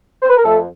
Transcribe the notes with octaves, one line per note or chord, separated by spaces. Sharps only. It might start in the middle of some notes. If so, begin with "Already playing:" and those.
C5
B4
A#4
F2 A3 A4